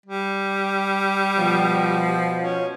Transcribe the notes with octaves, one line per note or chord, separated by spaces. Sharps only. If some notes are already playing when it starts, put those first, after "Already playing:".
G3
B2 F3
C#4